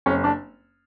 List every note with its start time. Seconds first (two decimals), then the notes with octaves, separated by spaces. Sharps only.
0.06 F#1 C#4
0.24 D4